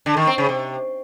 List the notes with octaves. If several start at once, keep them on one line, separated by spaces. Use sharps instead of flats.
D3
D#3
C4
C#3
C3